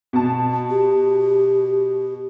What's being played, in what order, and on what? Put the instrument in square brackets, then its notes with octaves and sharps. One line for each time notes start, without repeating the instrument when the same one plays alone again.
[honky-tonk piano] B2 A5
[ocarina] G4